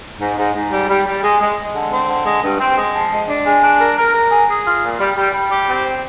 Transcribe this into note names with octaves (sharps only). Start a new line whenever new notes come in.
G#2
G#2
G#2
G3
G3
G3
G#3
G#3
G#3
D3
C4
D3
G#3
G2
C4
G#3
F3
G#3
D4
G#3
D4
A#4
A#4
A#4
G#4
G#4
F4
A#2
G3
G3
G3
G4
C4